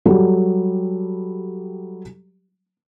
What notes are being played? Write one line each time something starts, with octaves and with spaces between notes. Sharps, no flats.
F#3 G3 G4 A4